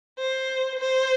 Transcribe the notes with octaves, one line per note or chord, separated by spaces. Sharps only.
C5
C5